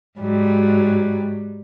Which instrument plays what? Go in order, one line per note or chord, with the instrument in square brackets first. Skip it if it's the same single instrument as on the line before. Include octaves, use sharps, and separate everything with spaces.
[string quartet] G#2 F#3 G3